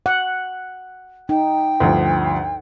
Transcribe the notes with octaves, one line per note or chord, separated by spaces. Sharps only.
F#5
D#4 G5
D2 G2 F3